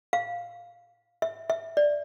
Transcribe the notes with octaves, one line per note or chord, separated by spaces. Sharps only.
F5
E5
E5
D5